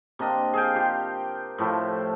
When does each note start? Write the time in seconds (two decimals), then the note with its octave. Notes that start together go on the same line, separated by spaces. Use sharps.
0.19 C3 A#3 D4 D#5
0.54 G#4 F5 G5
0.75 F4 G4
1.58 A2 F3 A3 E4